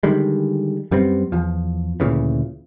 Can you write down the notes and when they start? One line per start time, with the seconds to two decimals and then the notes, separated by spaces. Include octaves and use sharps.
0.03 D3 D#3 G3 G#3
0.91 F#2 G3 B3 C4
1.32 E2 F3
2.00 D2 A#2 C#3 E3